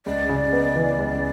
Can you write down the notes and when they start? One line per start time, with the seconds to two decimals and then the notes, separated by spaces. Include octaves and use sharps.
0.06 C#2 D5
0.29 C#3
0.53 B3
0.76 E3
0.98 C#2